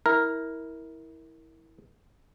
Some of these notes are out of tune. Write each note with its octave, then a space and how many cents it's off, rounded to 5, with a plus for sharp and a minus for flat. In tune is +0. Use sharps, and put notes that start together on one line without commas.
E4 -20 A#4 +0